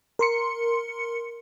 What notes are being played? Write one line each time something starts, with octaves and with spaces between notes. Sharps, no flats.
A#4 C6 C#7